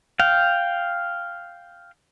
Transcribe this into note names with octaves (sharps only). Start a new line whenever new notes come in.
F5 G5